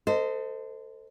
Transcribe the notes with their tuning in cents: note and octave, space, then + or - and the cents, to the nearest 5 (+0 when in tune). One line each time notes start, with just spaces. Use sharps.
A4 +25 C5 -20 D#5 +0